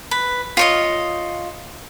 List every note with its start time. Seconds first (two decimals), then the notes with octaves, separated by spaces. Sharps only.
0.11 B4
0.57 F4 C#5 D#5